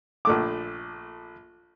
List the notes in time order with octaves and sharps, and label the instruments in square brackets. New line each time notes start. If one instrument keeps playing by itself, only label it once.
[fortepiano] A#1 A3 D6